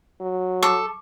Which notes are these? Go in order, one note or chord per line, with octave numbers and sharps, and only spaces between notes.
F#3
A4 C#6 D6